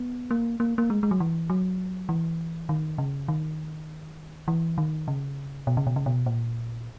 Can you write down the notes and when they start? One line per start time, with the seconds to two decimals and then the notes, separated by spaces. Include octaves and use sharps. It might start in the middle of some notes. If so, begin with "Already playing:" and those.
Already playing: B3
0.31 A#3
0.60 A#3
0.78 A#3
0.90 G#3
1.03 G#3
1.11 F#3
1.20 E3
1.50 F#3
2.09 E3
2.69 D#3
2.98 C#3
3.28 D#3
4.48 E3
4.78 D#3
5.08 C#3
5.67 B2
5.77 C#3
5.87 B2
5.96 C#3
6.06 B2
6.26 A#2